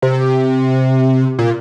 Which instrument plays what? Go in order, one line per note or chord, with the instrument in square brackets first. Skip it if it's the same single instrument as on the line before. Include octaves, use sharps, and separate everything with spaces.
[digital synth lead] C3
A#2